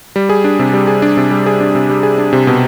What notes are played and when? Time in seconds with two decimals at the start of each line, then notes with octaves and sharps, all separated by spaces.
0.16 G3
0.29 G#4
0.44 D4
0.59 C3
0.73 G3
0.87 G#4
1.02 D4
1.17 C3
1.31 G3
1.46 G#4
1.60 D4
1.75 C3
1.90 G3
2.03 G#4
2.18 D4
2.33 C3
2.47 B2